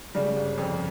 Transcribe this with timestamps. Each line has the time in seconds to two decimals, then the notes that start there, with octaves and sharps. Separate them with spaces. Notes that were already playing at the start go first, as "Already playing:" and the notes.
0.15 C#3 G3
0.37 G1
0.58 F2